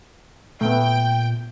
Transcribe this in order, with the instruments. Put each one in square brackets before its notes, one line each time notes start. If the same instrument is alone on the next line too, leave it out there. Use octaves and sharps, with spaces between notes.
[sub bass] A#2 [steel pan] A3 B3 [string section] G5